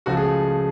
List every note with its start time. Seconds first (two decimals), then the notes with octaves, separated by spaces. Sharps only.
0.06 C#2 C#3 F3 A3 F#4
0.17 G#4